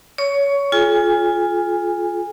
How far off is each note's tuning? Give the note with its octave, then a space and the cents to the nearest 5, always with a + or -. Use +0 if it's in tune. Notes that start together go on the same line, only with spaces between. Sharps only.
C#5 +20 C#6 +15
F4 +0 G#4 +45 G#5 -25